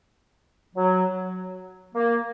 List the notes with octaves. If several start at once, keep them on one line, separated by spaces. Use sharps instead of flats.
F#3
A#3